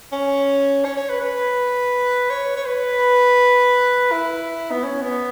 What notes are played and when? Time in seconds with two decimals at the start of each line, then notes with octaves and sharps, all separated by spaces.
0.12 C#4
0.85 C#5
0.97 C#5
1.09 B4
1.21 B4
2.30 C#5
2.56 C#5
2.66 B4
4.12 E4
4.71 B3
4.84 C#4
5.02 B3